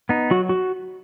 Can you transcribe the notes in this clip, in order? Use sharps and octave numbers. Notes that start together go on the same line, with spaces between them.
B3 D#4
F#3 F#4
F#4